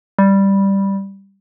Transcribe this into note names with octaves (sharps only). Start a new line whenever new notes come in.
G3